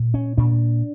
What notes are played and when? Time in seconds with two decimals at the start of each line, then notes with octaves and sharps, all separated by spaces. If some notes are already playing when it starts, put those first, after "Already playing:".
Already playing: A#2
0.14 C#4
0.38 A#2 D4